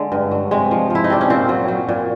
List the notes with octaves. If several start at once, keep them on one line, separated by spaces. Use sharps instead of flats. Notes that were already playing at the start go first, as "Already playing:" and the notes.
Already playing: D3 G#3
G2
F#3
C3 G#3
F3
F3 E4
D#4
C3 D4
C#4
A#2 C4
F#3
F#3
A#2